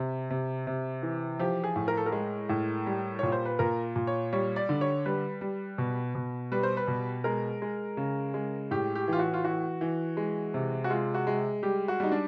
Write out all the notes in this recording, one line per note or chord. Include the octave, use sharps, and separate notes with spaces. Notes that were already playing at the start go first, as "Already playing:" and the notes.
Already playing: C3
C3
C3
E3
F3 G4
G#4
A2
A#4
A4
A#4
G#3
A2
G3
A#2 C#5
C5
B4
A#2 A#4
A#2
C#5
G3 C#5
D5
D3
C#5
G3 B4
G3
B2
B2
G3 B4
C5
B4
B2
G#3 A#4
G#3
C#3
G#3
A2 G4
G4
E3 F4
F#4
F4
E3 F#4
E3
G#3
C3
F#4
G#3 F4
F#4
G#3
G3 G4
F#4
G3 D#4
D4